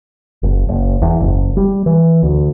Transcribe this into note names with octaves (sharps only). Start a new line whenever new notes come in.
F#1
F#1
E2
F#1
G3
E3
D2